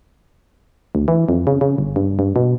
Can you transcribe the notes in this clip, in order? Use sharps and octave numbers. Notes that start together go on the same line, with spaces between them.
D2
E3
F2
C#3
C#3
G1
G2
G2
B2